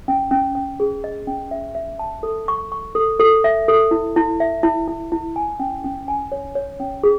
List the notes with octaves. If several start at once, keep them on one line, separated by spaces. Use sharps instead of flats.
C#4
C#4
C#4
G#4
D#5
C#4
E5
E5
A5
A4
C#6
C#6
A4
A4
E5
A4
E4
E4
E5
E4
E4
E4
G#5
C#4
C#4
G#5
C#5
C#5
C#4
G#4